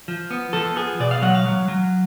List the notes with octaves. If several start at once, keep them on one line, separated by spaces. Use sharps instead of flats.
F3
B3
F3 A4
B3 G#4
B2 D5
F5
F#3 F#5
F5
F#3
F#3